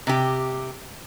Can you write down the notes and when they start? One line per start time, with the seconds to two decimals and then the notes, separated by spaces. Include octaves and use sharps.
0.07 C3 G4